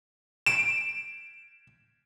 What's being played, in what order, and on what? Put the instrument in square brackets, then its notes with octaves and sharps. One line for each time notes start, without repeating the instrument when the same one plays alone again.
[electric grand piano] D7 E7